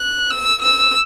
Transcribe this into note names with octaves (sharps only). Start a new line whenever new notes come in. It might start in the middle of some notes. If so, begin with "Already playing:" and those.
Already playing: F#6
E6
E6